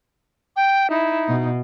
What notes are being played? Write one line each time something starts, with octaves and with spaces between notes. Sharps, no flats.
G5
D#4 E4
B2